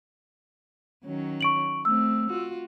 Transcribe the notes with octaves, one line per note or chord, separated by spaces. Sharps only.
D#3 F#3 C#4
C#6 D7 F#7
A3 C4 E6
F4 F#4